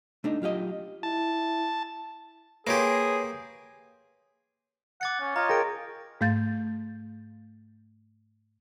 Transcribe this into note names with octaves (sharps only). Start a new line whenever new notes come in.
A3 D4 D#4
F#3 F4 G4 D#5
E4 A5
A#3 G4 G#4 B4 C#5 C6
F#5 D6 A6 C#7
C#4
F4 C#5 D#5 F5 A#5
G#4 A#4 G5 A#6 D7
G#2 A3 F5 G6 A6